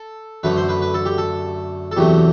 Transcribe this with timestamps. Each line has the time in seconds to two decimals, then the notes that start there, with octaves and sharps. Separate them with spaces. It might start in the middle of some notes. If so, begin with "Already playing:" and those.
Already playing: A4
0.43 F#2 D3 A3 B4
0.57 C5
0.69 B4
0.82 B4
0.94 A4
1.06 G4
1.18 A4
1.91 A4
1.97 E2 C3 F#3 A3 G4